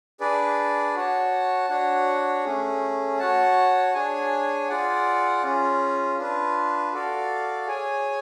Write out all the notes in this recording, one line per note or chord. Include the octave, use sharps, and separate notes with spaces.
D4 G#4 B4 D5
F#4 C#5 F#5 A5
D4 F#4 C#5 F#5
A3 C#4 G#4
F#4 C#5 F#5 A5
D4 G#4 C#5 G#5
F4 G#4 D5 F#5
C#4 F4 G#4
D4 F4 B4
F#4 A4 D5 F5
G#4 C#5 G#5